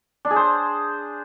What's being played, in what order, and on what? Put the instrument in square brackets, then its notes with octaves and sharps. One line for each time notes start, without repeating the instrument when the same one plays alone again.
[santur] D4
G#4
C5